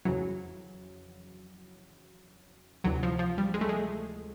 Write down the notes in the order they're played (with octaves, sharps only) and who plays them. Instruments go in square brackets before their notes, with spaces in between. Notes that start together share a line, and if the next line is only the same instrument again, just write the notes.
[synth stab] F2 C#3 E3 F#3
D2 C3 E3 F#3
F3
F3
G3
G#3
A3
G#3